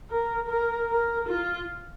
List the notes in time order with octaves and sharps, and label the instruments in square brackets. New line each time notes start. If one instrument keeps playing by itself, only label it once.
[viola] A#4
A#4
A#4
F4